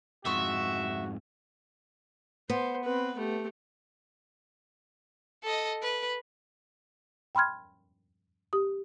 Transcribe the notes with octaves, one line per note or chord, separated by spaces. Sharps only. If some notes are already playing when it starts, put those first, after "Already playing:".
F2 G#2 F#4 E5 C6 C#6 D#6
B3 C5
C4 B4
A3 G4
A4 D#5
B4
G5 B5 C6 F6 G#6
G4 D#6